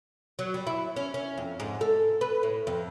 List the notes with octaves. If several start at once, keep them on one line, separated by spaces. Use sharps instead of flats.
F#3
G3
E4
C#4
C#4
F2
G#2
A4
B4
A2
F2